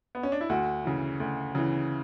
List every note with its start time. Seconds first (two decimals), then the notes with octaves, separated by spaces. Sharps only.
0.15 B3
0.23 C#4
0.32 D4
0.41 E4
0.49 D2 F#4
0.85 C#3 E3
1.20 D2
1.55 C#3 E3